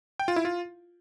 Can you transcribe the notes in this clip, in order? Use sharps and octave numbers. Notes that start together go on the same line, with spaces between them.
G5
F4
E4
F4